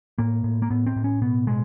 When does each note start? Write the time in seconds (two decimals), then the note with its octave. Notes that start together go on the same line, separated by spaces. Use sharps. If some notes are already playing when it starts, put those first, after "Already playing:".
0.18 A2 A#3
0.44 A2
0.62 A#3
0.70 A2 B3
0.86 C4
0.96 A2
1.04 C#4
1.22 B2 B3
1.47 B2 G#3